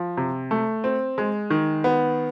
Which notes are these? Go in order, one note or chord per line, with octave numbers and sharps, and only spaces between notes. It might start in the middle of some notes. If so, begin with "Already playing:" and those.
Already playing: F3
C3
A3
C4
G#3
D#3
B3